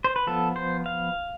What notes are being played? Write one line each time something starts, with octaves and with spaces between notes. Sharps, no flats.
C5
B4
F3 B3 A4
C5
F5